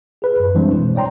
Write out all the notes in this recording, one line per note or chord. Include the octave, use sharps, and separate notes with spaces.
G#4 B4
F#2
E3 G3 G#3 C4 D4 C5
B2
C#5 D5 G5 A#5 C6